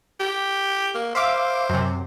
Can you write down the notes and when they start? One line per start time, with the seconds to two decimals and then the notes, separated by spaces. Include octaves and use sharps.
0.20 G4
0.95 A#3
1.15 C5 E5 F5 D6
1.70 F#2 C3